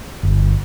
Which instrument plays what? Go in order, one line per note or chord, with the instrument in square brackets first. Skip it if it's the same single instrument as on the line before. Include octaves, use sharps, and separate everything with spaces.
[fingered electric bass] G1